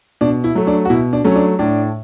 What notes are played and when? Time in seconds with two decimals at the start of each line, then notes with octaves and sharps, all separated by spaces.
0.21 B2 D4
0.44 E4
0.55 F#3 A3
0.67 D4
0.85 F#4
0.90 B2 E4
1.13 D4
1.24 F#3 A3 C#4
1.36 D4
1.59 A2 D4